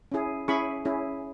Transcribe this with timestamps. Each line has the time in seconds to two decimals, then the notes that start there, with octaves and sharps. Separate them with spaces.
0.12 C#4 E4 G#4
0.48 C#4 E4 G#4 B5 C#6
0.85 C#4 E4 G#4